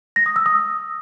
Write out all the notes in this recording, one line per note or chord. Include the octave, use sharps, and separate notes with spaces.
A#6
D#6
E6
D#6